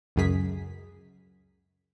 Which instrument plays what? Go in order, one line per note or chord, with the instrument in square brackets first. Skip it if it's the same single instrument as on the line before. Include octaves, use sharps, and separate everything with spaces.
[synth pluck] C#2 F#2 C#3 G#4 B6